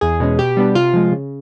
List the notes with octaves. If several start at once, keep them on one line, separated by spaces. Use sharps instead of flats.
E2 G#4
B2 G#3 C#4
B2 G4
G3 B3 D4
C3 F4
F3 G#3
C#3